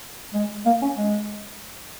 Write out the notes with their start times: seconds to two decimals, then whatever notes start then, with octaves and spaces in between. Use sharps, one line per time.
0.34 G#3
0.66 A#3
0.82 C#4
0.98 G#3